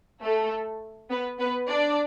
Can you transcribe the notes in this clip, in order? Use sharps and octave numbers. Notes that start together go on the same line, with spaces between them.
A3 A4
B3 B4
B3 B4
D4 D5